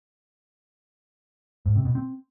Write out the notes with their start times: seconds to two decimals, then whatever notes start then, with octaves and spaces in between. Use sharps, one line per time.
1.66 G#2
1.75 C3
1.85 B2
1.95 C4